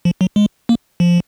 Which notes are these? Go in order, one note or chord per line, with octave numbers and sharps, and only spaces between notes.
F3
F#3
G#3
A#3
F3